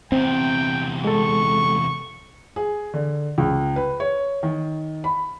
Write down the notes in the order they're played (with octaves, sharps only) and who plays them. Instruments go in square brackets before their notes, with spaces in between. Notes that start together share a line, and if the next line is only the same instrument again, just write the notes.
[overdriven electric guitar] E2 C3 [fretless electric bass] C4 [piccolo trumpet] G5
[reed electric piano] G#3 A4 [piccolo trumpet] C#6
[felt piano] G#4
D3
C#2
B4
C#5
D#3
B5